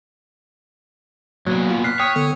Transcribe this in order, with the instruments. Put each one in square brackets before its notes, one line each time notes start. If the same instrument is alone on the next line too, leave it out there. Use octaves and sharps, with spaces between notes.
[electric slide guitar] A#2 B3 [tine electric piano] F#3
[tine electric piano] F4
[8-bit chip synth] F6 F#6 B6 [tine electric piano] C7
[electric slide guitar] C#5 [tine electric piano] G5 D#6
[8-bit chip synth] D3 B3 A4